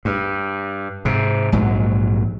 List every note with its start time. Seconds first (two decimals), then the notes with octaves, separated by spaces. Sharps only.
0.05 G2
1.05 G#2 C3
1.52 A#1 G#2 F#3